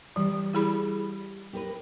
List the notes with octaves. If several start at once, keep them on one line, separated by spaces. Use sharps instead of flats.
E3 G3
E4 G#4 B5
G4 A#4 B4